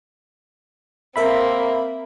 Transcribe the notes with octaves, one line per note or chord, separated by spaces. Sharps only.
A#3 C4 A#4 E5 B5